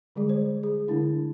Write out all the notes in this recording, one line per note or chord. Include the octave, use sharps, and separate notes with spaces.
D3 G3 G#3 G#4
C5
G#4
D3 A3 D4 E4